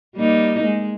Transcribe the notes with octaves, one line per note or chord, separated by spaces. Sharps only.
G3 A#3 D#4
G#3